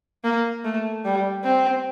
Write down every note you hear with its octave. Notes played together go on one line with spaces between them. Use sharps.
A#3
A3
G3
C4